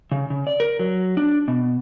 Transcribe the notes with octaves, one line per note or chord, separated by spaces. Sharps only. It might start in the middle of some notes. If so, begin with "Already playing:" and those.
C#3
C#3
D5
A#4
F#3
D4
B2